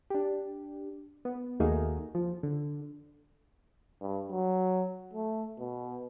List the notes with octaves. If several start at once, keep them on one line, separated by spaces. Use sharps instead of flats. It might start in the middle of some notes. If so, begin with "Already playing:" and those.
D4 G4
B3
D#2 A3 A#3 D#4 F#4 G#4
F3
D3
G2
F#3
A3
B2